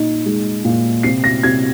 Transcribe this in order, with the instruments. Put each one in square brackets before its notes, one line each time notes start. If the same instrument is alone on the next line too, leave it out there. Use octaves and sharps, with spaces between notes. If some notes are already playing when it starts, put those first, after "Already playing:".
Already playing: [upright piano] A#2 D#4
G#3
A#2
C3 C7
A#6
C3 G#6